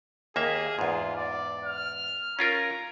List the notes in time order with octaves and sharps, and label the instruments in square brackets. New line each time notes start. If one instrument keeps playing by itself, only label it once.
[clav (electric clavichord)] D#2 A#3 E5 [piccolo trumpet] G#4
[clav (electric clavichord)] E2 G#2 [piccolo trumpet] F4
[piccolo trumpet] D5
F6
[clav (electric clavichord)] C#4 F4 A#4 [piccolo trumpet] A#5